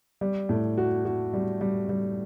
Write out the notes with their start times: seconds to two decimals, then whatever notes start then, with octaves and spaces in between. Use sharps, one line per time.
0.21 G3
0.49 A2
0.78 F#4
1.05 F#4
1.33 G3
1.61 G3
1.89 G3